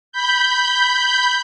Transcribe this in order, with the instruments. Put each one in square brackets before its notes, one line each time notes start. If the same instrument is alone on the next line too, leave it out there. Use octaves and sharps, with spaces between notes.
[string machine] B5 G6